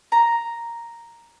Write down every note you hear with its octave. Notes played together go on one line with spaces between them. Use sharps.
A#5